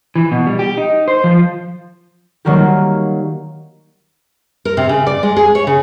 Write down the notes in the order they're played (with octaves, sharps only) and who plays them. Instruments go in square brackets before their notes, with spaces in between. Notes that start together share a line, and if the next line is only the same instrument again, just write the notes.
[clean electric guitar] E3
B2
G3
G4
D#4
C5
F3
[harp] D#3 F#3 G3 A#3 F#4 G4
[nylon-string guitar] A#4
C3
C#3
D5
G#3
G#4
C#5
C#3